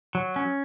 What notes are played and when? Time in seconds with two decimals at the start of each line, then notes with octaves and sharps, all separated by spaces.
0.15 F#3
0.36 C#4